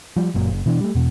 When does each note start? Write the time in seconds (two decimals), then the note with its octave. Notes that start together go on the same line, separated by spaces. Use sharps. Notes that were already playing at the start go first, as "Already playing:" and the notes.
0.16 F3 G3
0.34 F#1 F#2 A#2
0.51 F#1
0.66 B2 E3 D4
0.81 G3 A3
0.95 E2 B2